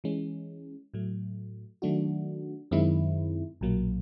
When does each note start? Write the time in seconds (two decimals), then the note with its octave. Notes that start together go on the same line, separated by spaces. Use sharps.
0.04 E3 G#3 C#4
0.94 A2 F#3 A3
1.82 D#3 F#3 A3 D4 F#4
2.71 F#2 D#3 G#3 C4 E4
3.61 B1 A#2 F#3 A#3